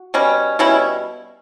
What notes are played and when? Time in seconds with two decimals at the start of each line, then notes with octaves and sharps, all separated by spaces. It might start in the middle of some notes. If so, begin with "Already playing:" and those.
Already playing: F#4
0.14 B2 G3 C#4
0.59 B2 G3 C#4 E4